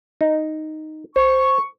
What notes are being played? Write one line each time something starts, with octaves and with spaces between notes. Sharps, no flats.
D#4
C5 C#6